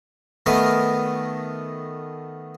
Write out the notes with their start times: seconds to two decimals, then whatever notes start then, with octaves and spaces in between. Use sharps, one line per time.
0.46 D#3 A3 B3 A#4